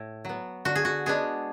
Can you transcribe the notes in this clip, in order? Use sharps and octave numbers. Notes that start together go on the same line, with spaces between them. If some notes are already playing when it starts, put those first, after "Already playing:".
Already playing: A2
F#3 B3
D3 F#4
G#4
F#4
G#3 B3 D4 G#4